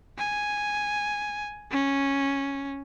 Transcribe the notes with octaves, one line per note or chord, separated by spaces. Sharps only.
G#5
C#4